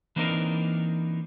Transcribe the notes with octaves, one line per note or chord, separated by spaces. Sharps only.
E3 A#3 C4 D4 D#4 A#4